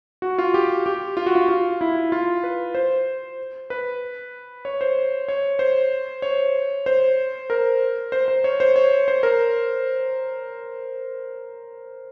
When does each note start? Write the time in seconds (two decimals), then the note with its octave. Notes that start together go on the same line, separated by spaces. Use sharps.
0.22 F#4
0.38 F4
0.54 G4
0.86 G4
1.17 F4
1.26 F#4
1.35 F4
1.49 F4
1.81 E4
2.12 F4
2.44 B4
2.75 C5
3.70 B4
4.65 C#5
4.81 C5
5.28 C#5
5.59 C5
6.22 C#5
6.86 C5
7.50 A#4
8.12 C5
8.28 C5
8.44 C#5
8.60 C5
8.76 C#5
9.08 C5
9.23 A#4